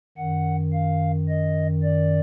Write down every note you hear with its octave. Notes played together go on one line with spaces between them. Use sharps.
F#2 D#3 F#5
F5
D#5
D5